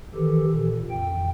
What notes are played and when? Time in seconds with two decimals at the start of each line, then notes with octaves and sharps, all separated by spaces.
0.15 D#3 E3 G4 A4
0.50 A#2
0.90 F2 G5